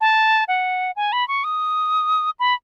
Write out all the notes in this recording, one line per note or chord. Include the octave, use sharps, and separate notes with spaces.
A5
F#5
G#5
B5
C#6
D#6
B5